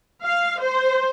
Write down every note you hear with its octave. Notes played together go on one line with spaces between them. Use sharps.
F5
C5